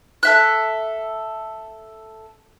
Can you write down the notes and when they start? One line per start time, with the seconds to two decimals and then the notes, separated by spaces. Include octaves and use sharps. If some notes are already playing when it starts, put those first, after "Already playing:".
0.23 A4 E5 F#6